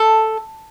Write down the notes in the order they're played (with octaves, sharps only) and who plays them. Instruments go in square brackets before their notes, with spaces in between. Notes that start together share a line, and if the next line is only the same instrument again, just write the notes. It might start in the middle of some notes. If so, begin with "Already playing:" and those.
Already playing: [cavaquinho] A4